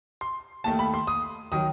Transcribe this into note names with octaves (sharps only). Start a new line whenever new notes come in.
C6
D#2 D#3 A3 A5
B5
C6
D#6
D#3 F#3 D#6